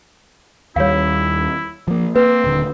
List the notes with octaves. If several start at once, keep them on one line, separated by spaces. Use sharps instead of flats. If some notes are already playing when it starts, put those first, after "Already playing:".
D#2 G3 E4 C#5 F5
F3 A#3
A#3 C4 B4
D#1 D3